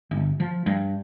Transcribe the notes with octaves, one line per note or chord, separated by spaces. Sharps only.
G1
F3
G2